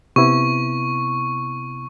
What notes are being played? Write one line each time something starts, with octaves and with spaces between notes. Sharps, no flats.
C3 B3 E4 C#6